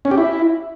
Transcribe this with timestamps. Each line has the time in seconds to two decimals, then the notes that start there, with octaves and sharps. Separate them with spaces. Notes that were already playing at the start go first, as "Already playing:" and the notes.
0.05 C#4
0.11 G4
0.18 E4